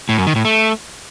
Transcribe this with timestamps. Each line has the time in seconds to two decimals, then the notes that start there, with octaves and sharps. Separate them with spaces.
0.09 A2
0.18 F#2
0.27 D#3
0.36 A2
0.45 A3